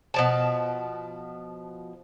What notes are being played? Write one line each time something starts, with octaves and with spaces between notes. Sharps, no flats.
B2 F3 A5